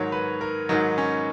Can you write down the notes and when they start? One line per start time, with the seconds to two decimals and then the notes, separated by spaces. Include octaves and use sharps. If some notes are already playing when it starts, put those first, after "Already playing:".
Already playing: G#2 D#3 F#3 C#5
0.12 B4
0.41 A#4
0.69 G#2 D#3 F#3 D#4
0.98 C#4